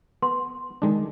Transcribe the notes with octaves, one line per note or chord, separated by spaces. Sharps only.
B3 C6
D#3 G#3 D4